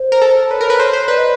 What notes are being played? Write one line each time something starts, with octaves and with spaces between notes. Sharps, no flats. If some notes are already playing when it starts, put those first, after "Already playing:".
Already playing: C5
A#4
A4
B4 C#5
A#4
B4
C5 C#5
C5
B4 D5
D#5